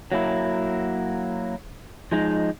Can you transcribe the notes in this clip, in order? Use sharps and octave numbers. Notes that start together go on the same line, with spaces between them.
F#3 A#3 E4
F3 G#3 D#4